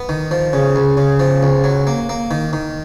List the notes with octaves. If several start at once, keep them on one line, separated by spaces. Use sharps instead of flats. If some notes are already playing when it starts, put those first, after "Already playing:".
Already playing: B3
D#3
F3
C#3
C#2
C#3
F3
C#2
F#3
A#3
A#3
D#3
D#3